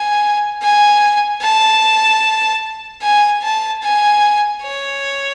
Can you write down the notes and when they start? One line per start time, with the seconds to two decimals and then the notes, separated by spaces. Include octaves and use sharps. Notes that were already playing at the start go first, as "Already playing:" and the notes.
Already playing: G#5
0.62 G#5
1.41 A5
3.02 G#5
3.43 A5
3.83 G#5
4.63 C#5